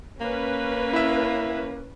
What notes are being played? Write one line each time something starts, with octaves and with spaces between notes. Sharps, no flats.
A#3 C#4 B4
E4 E5